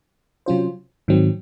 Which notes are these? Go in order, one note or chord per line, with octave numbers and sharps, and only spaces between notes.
C3 F#3 C#4 F4 C5
G#2 D#3 F#3 C4